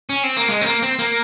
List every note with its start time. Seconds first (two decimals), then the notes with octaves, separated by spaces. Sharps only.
0.09 C#4
0.23 C4
0.37 A#3
0.49 G#3
0.61 C4
0.66 A#3
0.82 C4
0.99 A#3